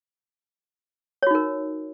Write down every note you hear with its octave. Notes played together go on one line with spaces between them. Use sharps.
D#4 F#4 A#4 C#5